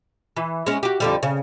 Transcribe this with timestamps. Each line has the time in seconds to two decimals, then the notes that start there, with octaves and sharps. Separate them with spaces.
0.37 E3
0.66 G#3 C#4
0.83 F#4 G4
1.00 F2 D3 G3
1.23 C#3